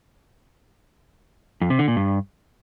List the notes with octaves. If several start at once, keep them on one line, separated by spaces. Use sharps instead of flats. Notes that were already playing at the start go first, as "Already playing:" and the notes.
F2
C3
D3
A#2
G2